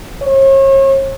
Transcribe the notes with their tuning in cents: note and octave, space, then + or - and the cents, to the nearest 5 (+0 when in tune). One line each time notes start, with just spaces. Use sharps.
C#5 -40